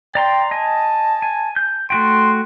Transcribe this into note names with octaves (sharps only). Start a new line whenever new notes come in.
D5 G5 A#5 C6
D#5 G#5 A5
G#5
G6
A3 F#4 G5 C6